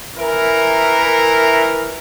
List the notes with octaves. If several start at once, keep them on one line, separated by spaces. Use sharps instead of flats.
E3 E4 A#4